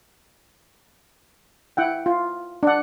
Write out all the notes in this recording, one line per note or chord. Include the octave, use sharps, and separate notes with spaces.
E4 F#5 G5
F4
D4 F#5